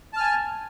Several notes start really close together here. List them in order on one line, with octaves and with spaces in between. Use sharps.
A5 F6 G#5